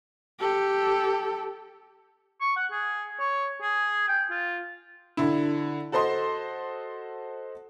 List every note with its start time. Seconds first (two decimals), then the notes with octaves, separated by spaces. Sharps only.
0.40 G4 A4
2.41 C#6
2.56 F#5
2.72 G#4
3.20 C#5
3.62 G#4
4.08 G5
4.30 F4
5.17 D3 E4
5.92 F#4 A4 C5 D#5 C6